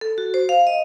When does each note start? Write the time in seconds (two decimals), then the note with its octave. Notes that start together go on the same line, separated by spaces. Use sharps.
0.01 A4
0.18 F#4
0.34 C5
0.49 F5
0.67 D#5